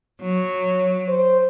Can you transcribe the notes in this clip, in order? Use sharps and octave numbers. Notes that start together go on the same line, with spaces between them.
F#3
C5